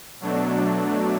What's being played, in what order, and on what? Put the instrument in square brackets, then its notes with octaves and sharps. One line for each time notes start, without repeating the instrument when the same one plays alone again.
[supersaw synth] B2 F#3 A3 D4